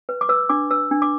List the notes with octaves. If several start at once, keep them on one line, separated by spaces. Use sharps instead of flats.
B4
D6
B4 E6
D4 D6
B4 E6
D4
D6